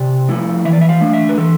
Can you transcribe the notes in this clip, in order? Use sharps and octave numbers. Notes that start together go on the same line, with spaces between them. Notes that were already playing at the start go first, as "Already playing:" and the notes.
Already playing: C3 D5
F3 A3 E4
E3 E5
D5
E5
F5
A3 D4
E5
B4
E3 A4